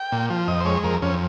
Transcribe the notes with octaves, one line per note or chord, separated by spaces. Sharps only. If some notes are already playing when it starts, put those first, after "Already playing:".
Already playing: G5
A#2
F3
F2 D#5
C5
G#3 C#5
F2 A#4
F2 C#4